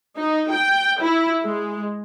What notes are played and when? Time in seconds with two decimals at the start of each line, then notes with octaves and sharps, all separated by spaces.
0.17 D#4
0.51 G5
1.01 E4
1.42 G#3